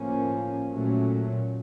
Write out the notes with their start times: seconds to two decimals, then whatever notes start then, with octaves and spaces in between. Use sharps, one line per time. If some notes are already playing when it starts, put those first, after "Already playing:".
Already playing: A2 F3 A#3 C#4
0.70 A#2 F#3 A3 C#4